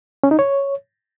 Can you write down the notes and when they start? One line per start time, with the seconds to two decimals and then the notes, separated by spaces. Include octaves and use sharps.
0.24 C#4
0.31 D#4
0.39 C#5